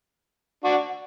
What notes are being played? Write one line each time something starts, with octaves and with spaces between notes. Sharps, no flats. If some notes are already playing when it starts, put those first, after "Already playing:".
D4 F#4